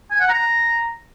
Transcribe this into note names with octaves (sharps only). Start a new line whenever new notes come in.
G#5
F#5
A#5